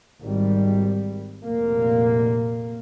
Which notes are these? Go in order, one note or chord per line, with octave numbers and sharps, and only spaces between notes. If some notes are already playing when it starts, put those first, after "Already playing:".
G#1 G3
F1 A#2 A#3